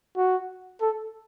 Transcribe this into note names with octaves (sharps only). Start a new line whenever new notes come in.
F#4
A4